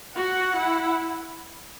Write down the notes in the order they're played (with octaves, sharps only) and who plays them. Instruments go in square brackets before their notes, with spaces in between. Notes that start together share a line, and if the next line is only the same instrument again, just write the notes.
[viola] F#4 [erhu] F#5
[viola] E4